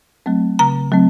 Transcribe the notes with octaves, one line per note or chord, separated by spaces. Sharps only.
F#3 A3 C4
C#3 A#5
F#3 A3 C4